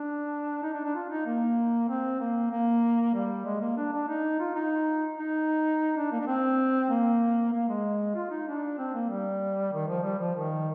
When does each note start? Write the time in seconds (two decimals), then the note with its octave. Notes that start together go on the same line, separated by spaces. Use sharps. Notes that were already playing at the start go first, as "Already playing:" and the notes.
Already playing: D4
0.63 D#4
0.74 D4
0.84 D4
0.95 F4
1.09 D#4
1.26 A#3
1.89 C4
2.20 A#3
2.50 A#3
3.14 G3
3.45 G#3
3.61 A#3
3.77 D4
3.93 D4
4.08 D#4
4.40 F4
4.55 D#4
5.18 D#4
5.97 D4
6.11 A#3
6.21 D4
6.27 C4
6.90 A#3
7.53 A#3
7.69 G#3
8.15 F4
8.31 D#4
8.48 D4
8.78 C4
8.94 A#3
9.09 G3
9.73 D#3
9.88 F3
10.03 G3
10.19 F3
10.35 D#3